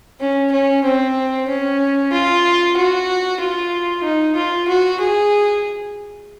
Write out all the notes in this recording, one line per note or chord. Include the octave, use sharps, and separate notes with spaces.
C#4
C#4
C4
C#4
F4
F#4
F4
D#4
F4
F#4
G#4